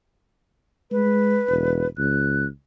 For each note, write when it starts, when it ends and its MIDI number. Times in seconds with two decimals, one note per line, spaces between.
0.91 1.40 56
0.91 1.88 71
1.50 1.86 28
1.98 2.47 37
1.98 2.46 90